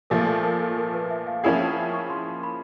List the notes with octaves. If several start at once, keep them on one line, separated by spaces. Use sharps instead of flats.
A#2 F3 A3 A#4
A4
A#4
A4
A#4
B4
E5
F5
F3 A#3 C#4 E4 G#4 F#5
G5
G#5
C#6
C6
B5